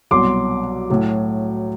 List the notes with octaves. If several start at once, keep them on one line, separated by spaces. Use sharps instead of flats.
C2 B2 F#3 C6 D6
A2 F#3